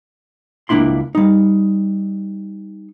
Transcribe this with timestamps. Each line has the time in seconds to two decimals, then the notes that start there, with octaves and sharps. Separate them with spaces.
0.69 C#2 A#3 D4 E4 C6
1.15 G3 D#4